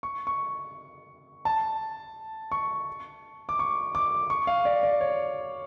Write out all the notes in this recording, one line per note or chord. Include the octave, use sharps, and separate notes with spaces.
C#6
C#6
A5
C#6
D6
C#6
D6
C#6
F5
D5
D5
C#5